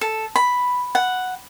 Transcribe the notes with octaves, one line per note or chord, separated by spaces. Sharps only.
A4
B5
F#5